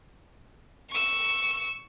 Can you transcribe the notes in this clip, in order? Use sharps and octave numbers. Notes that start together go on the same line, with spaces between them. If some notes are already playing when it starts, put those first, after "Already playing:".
C#6 E6